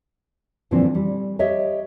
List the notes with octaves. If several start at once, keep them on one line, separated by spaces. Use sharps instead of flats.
G2 A#2 D3 E3 F3 C4
G3
G4 C#5 D#5 E5